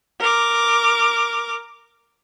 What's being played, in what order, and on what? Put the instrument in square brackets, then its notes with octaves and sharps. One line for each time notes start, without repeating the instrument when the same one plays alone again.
[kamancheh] A#4 D6